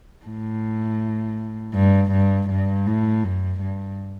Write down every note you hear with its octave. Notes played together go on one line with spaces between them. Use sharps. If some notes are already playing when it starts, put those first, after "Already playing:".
A2
G2
G2
G2
A2
F#2
G2